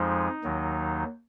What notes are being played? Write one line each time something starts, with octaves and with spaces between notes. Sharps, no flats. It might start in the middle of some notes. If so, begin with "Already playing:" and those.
Already playing: F2 F3 G#3 D#4
D#2 D#3 F#3